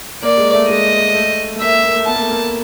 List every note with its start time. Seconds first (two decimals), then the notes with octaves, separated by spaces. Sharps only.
0.22 A#3 D5
0.37 G#3
0.53 A3
0.68 G#3 D#5
1.14 A3
1.56 A3
1.61 A#3 E5
1.73 A#3
1.84 A#3
1.95 A3
2.06 B3 A5
2.15 A#3
2.22 A3
2.31 A#3